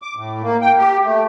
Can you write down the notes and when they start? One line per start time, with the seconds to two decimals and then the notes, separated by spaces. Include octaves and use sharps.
0.02 D6
0.15 A2
0.42 A#3
0.61 G5
0.78 G4
1.04 A3